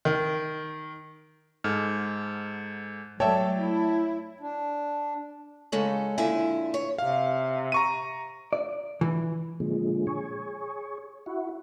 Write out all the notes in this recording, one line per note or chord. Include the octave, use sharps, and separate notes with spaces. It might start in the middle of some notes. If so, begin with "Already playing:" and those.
D#3
G#2 A4 F6
F#3 A3 A4 C#5 D5 E5 G5 A5
E4
D4
C#3 G#3 C#4 A4
A#2 D3 E4 E5 G#5
C#5
C3 F5
A#5 C#6 D#7
D5
E3
A#2 D3 F3 G#3
G#4 C#5
E4 F#4